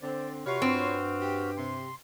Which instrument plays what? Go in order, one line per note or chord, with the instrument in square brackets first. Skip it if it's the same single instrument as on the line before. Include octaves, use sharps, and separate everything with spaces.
[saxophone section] D3 C4 [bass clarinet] C5 [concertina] D5
[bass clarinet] C3 [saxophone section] F4 B4 C#5 [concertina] F#4 F6
[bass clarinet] G2 [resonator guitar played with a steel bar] C4
[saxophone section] G4
[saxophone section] C3 [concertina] C6